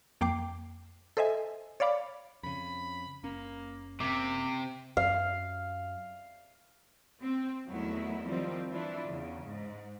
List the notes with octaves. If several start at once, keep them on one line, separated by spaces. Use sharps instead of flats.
F2 A#3 G5 D6 C7
A4 C5 D#5 E5 G#5
C#5 D5 F5 B5 D6
F2 C#3 B5
F#1 A#3 C#4
C3 A#3 D6 B6
F#2 F5
C4
E2 D#3 F#3 A3 B3 E4
D#3 F3 G3 C4
E3 D4 E4 F4
E2 C#3
G#2